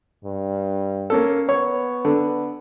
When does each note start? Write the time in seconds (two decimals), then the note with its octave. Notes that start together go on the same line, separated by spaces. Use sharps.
0.25 G2
1.10 A#3 C#4 A4
1.49 B3 C#5
2.05 D3